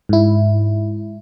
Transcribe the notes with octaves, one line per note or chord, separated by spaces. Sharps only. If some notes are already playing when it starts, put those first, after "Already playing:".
G#2 E4